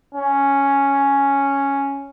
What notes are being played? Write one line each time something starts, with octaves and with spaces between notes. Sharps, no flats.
C#4